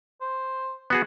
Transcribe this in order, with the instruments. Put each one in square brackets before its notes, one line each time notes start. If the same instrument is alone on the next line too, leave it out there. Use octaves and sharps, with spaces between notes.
[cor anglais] C5
[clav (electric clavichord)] B3 F#4 G#4